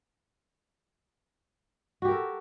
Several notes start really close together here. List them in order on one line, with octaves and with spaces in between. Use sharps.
F#4 G4 A#4 A4